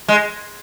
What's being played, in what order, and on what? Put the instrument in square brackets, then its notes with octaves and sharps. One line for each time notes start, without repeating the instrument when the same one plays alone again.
[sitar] G#3